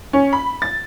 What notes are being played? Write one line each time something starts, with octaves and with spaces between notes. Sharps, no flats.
C#4
B5
A6